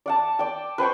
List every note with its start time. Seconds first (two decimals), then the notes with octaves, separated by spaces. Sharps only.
0.06 D5 F#5 A5
0.39 D5 G5
0.78 B4 C5 G5 C#6